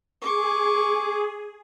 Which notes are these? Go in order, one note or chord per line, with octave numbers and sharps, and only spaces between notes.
G#4 C#6 D6